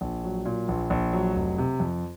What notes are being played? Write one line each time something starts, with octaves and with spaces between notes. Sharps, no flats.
A#1
F#3
A#2
A#1
A#1
F#3
F1
C3
F2